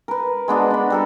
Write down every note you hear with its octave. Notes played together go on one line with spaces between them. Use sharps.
A#4 B4
G#3 B3 D4 F#4
D4 B5
G3 A4 A#4